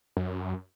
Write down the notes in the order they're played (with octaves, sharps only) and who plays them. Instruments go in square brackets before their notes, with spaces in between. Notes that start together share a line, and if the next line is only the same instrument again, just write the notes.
[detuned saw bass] F#2